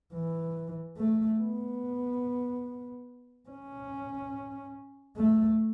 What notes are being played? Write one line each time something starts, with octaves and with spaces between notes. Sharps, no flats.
E3
A3
B3
C#4
A3